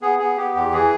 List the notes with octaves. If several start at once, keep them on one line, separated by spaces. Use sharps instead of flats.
B3 G#4
B3 G#4
B3 G4
E2 G4
E3 G#4